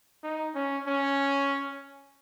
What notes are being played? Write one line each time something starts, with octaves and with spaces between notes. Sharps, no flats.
D#4
C#4
C#4